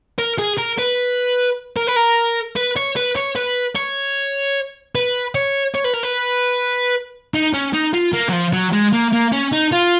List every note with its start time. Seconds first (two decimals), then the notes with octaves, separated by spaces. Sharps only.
0.18 A#4
0.38 G#4
0.58 A#4
0.78 B4
1.77 A#4
1.87 B4
1.96 A#4
2.56 B4
2.77 C#5
2.96 B4
3.16 C#5
3.36 B4
3.76 C#5
4.95 B4
5.35 C#5
5.75 C#5
5.85 B4
5.94 A#4
6.03 B4
7.34 D#4
7.54 C#4
7.74 D#4
7.94 F4
8.13 A#3
8.29 F#3
8.33 F3
8.53 F#3
8.73 G#3
8.93 A#3
9.13 A#3
9.33 C#4
9.53 D#4
9.73 F4